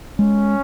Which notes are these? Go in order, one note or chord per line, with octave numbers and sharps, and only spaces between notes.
G#3 C#4